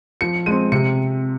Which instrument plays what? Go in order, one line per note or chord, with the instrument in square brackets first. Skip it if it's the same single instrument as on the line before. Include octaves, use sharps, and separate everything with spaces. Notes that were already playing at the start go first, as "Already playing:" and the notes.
[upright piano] F3 C#7
G#3 C4 D#7
C3 C#7